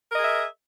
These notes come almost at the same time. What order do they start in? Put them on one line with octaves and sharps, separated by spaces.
A#4 D#5 G#4 E5